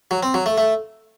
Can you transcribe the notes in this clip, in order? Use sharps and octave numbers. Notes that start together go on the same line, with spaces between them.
F#3
C4
F#3
A3
A3